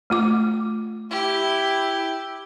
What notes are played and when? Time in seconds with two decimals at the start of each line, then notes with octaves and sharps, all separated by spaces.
0.10 A3 F4 D6
1.11 E4 G4